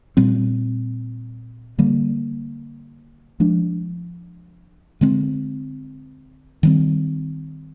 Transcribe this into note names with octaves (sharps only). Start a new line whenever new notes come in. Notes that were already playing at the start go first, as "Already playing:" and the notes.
A#2 G3 C4
D3 G3 A#3
F3 G#3 D4
D3 G#3 C4
D#3 G3 C4